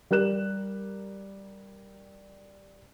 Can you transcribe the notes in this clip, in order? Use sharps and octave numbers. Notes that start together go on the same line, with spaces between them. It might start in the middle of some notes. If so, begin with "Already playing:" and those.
G3 G4 A#4 F#6 E7